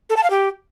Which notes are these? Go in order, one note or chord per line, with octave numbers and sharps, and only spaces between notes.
A4
A5
F5
G4